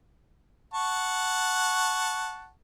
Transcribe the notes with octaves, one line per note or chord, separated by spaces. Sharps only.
F#5 A5 C#6